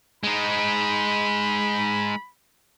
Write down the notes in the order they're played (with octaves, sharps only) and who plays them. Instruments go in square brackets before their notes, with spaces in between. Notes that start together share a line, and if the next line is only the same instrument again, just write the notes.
[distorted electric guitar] G#3 D#4 [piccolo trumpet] B5